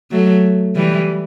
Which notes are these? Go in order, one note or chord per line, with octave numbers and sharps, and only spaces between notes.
F#3 A3
E3 G3